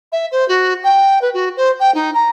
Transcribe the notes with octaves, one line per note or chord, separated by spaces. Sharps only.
E5
C5
F#4
G5
B4
F#4
C5
G5
D#4
A#5